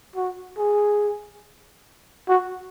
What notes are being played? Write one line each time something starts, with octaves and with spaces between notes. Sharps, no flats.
F#4
G#4
F#4